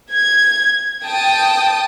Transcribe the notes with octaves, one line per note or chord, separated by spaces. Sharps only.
G#6
G5 A5 D#6